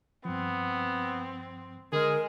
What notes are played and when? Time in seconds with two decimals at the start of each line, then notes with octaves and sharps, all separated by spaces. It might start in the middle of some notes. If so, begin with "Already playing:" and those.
0.25 G2 F3 B3 C4
1.93 D3 G#3 G#4 A#4